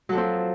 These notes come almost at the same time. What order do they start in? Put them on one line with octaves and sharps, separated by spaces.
F#3 A4 F3 C4